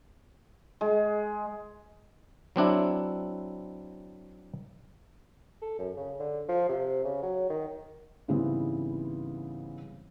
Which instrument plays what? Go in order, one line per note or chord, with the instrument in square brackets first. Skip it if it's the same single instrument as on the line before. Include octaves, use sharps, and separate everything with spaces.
[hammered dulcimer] G#3
[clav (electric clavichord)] F#3 C4 D4 E4
[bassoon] A4
F#2
C#3
D3
F3
C3
C#3
F#3
D#3
[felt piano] G#2 C#3 E3 G3 B3 C4